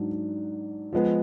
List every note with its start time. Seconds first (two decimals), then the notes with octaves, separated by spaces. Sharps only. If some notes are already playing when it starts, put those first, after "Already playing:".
Already playing: G#2 F#3 D4
0.93 F3 G#3 B3